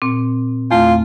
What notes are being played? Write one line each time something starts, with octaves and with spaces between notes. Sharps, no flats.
A#2 C4
E2 A3 F4